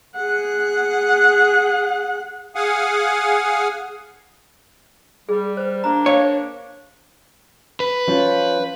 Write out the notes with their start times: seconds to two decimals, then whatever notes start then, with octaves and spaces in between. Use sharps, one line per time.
0.17 G#4 F#5
2.55 G#4 F5 F#5 G#5
5.29 G3 G#4
5.57 B4 C5
5.84 A#3 D4 A#5
6.06 C#5 F5 G5 D6
7.80 B4
8.07 F3 C#4 F4